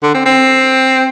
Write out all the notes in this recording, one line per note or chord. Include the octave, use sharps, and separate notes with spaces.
D3
C4
C4